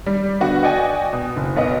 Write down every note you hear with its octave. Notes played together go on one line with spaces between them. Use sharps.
G3
D3 B3 F#4 B4
F#4 D5 D#5 G5 G#5
B2
F#1
B1 B3 D#5